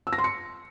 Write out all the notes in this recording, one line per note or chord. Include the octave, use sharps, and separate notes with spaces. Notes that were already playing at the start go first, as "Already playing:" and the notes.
E6
A#6
C6
C#7